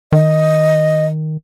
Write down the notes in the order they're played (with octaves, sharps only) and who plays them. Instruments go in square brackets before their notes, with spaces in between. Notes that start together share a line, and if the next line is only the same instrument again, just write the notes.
[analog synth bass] D#3 [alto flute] D#5